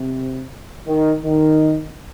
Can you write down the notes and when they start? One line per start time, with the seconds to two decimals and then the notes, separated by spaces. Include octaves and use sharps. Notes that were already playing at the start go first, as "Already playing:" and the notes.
Already playing: C3
0.87 D#3
1.23 D#3